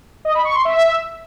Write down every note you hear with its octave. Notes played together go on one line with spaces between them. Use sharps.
D#5
B5
C#6
C6
E5